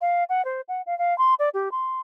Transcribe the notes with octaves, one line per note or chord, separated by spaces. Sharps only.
F5
F#5
C5
F#5
F5
F5
C6
D5
G4
C6